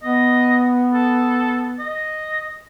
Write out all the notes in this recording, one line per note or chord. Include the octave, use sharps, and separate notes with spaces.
B3 D#5
A4
D#5